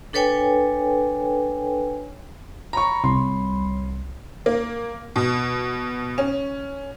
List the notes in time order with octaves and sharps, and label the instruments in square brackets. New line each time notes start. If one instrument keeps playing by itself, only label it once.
[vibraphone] D4 A4 B4 C#5 G5 G#5
[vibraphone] C#5 B5 [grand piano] A#5 C#6
[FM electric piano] C2 [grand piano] C6
[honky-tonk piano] A#3
B2
C#4